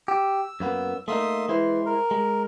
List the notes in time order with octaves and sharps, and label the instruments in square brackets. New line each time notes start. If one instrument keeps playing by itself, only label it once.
[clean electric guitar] G4 [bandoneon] E6
[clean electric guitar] F#2 A#3 B3
[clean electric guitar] A3 A#3 D#4 [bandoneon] E5 C6 D#6
[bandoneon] E3 [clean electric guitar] G#3 E4 C5
[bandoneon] A#4
[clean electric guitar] G#3